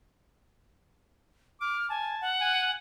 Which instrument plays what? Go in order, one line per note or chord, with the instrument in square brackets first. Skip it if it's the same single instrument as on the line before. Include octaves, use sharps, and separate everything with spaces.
[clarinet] D6 [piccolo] F6
[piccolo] G#5 [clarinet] A5
[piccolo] F#5
[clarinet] G#5